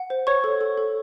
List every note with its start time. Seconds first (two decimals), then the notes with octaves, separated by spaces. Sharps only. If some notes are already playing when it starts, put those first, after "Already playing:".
Already playing: F#5
0.10 C5
0.27 C5 C#5 C#6
0.44 A4
0.61 A4
0.78 A4